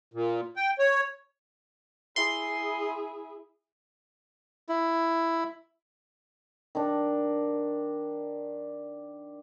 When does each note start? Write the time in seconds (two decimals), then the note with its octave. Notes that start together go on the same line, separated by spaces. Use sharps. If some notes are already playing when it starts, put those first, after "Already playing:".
0.14 A#2
0.56 G5
0.79 C#5
2.16 E4 G#4 C6
4.69 E4
6.75 D#3 D4